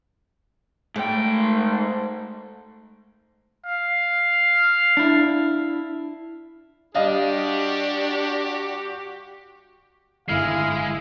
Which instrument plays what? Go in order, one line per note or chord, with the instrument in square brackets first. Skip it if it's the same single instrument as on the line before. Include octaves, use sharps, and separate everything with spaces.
[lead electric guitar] G#2 G5 [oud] A3
[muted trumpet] F5
[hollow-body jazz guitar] D4 E4
[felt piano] G3 D#5 F5 [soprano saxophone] D4 [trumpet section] F#4 G4
[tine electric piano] G1 F6 C7 [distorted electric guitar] G#3 [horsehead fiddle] E4 G#4 [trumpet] F5